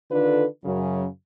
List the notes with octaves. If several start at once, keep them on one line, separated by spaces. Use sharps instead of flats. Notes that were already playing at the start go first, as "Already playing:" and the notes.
D3 D#3 D4 F4 A4 B4
F#2 C#3 F#3